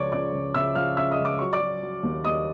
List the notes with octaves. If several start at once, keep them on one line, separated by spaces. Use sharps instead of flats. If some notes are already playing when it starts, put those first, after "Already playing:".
Already playing: C#2 F3 C#5 D5 C#6 D6
C#3 D5 D6
C#2
C#3 E5 E6
F3 F5 F6
C#3 E5 E6
D#5 D#6
C#2
D6
F#3 C#6
D5 D6
F#3
F#3
D#2
D#2 D#5 D#6